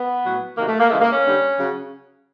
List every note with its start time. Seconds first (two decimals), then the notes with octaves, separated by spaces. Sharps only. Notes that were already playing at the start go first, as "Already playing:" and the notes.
Already playing: B3
0.23 A2 F#3
0.56 C3 D#3 F#3 A#3
0.67 A3
0.78 A#3
0.89 C#3 E3 G#3 A3
1.00 A#3
1.11 C#4
1.22 D3 G3
1.55 C#3 F#3